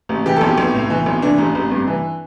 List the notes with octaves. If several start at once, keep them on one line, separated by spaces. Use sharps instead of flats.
A1
E3 G4
B1 A4
G4
B1
A2
E3
B1
E3 D4
A1
A1
G2
E3